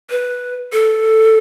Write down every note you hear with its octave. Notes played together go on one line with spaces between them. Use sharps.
B4
A4